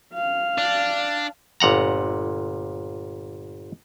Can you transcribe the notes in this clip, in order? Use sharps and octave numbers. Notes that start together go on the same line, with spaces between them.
F5
D4
G1 A#2 F#5 A#5